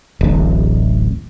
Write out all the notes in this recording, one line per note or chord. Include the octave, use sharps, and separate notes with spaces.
D1 A1